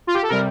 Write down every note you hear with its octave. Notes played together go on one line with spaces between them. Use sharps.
F4
G4
A4
C3 G3 A#4